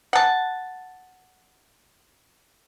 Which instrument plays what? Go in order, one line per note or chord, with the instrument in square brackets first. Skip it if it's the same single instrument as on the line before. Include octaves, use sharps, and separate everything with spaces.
[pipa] F#5 A5